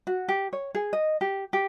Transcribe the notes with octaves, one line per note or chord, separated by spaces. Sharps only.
F#4
G4
C#5
G#4
D#5
G4
G4